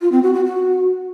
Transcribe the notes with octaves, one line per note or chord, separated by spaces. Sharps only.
F4
C4
F#4
F#4
F#4